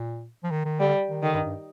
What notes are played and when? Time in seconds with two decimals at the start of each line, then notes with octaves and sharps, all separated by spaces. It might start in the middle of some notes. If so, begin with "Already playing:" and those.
Already playing: A#2
0.44 F3
0.51 D#3
0.65 D#3
0.80 D3 G3
1.09 D#3
1.23 D3 D#3
1.34 G2
1.45 G2